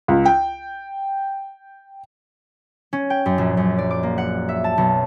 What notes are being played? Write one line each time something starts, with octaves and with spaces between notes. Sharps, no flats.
C#2
G5
C#4
G5
F#2
A#1
F#2
D5
D6
A#3
F#5
E5
A5
B1